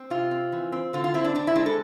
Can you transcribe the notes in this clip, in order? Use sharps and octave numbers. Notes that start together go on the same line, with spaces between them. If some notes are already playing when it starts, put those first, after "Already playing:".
Already playing: C4
C3 F4
C4
E3
C4
D3 F4
F4
C4 E4
D4
C4 D4
E4
G#3 D4
A4